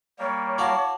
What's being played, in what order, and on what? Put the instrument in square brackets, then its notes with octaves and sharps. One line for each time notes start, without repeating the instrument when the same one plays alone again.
[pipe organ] G3 A#3 [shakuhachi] C#5
[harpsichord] E4 F#4 F5 [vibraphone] A5 D6